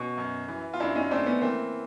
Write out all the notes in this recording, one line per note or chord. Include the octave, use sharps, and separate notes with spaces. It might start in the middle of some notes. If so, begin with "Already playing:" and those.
Already playing: B2 C#4
F#2
E3
F4
F#2 D4 E4
C#4 D#4
A3 C4 D4
B3 C#4
E3 A#3 C4